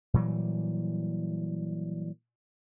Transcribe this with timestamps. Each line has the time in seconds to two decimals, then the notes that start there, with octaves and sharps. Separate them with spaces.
0.14 A#2 E3 F#3 G3